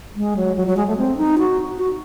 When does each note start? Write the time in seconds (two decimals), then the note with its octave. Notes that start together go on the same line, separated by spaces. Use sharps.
0.16 G#3
0.37 F#3
0.56 F#3
0.67 F#3
0.77 G#3
0.87 A3
0.98 C4
1.17 D#4
1.38 F#4
1.78 F#4